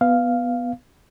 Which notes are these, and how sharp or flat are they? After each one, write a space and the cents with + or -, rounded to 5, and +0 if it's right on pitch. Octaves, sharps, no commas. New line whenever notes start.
B3 +0 F5 +0